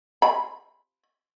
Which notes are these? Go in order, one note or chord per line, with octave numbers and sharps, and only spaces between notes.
B5